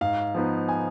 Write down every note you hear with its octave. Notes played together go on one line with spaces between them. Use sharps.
G#2 F5
F3 B3 D#4
G#5